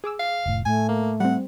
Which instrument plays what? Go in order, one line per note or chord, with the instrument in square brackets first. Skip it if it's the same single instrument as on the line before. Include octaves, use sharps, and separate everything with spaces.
[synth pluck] G#4 D6 E6
[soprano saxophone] F5
[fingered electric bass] F1 A2
[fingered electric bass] A2 [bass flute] A3 [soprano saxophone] G#5
[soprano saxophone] A#3
[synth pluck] G3 C4 [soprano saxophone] F#5